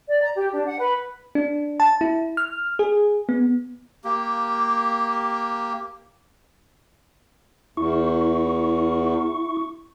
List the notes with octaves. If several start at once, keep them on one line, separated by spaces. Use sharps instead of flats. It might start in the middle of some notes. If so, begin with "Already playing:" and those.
D5
A#5
G4
D4
F#5
B4
D4
A5
E4
F6
G#4
B3
A#3 G4
E2 E4 C#6